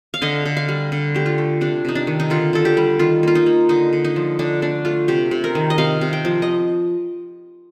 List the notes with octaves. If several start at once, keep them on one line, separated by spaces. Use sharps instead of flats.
F5
D3 D#5
D3
F5
G3
D3
A3 G4
F4
A3
C3 D4
C3 D#4
D4
D#3
D#4
D3 F4
D3 A4
G4
G3
D#3 F4
A#3 F4
D#4
A#3
D3 D#4
D3
D#4
F3
D3 D4
A3 D4
A3 F4
C3 G4
C3
A#4
D#3
D#5
C3 F5
C3
G5
F3
D#5